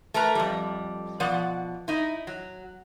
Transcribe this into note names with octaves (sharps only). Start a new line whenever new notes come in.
A3 A#4 B4 A#5
F2 G3
B2 F3 D5 F#5
D#4 E4
F#3